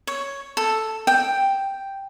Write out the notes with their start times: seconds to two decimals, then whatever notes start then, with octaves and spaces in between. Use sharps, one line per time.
0.07 C#5
0.57 A4
1.07 G5